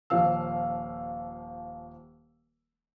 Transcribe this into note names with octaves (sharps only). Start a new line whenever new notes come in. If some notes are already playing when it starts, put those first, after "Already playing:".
D#1 F3 F5 E6